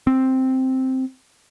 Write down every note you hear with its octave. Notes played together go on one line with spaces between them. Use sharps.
C4